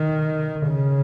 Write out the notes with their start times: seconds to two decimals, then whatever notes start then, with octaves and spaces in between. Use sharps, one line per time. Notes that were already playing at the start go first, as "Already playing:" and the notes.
Already playing: D#3
0.67 C#3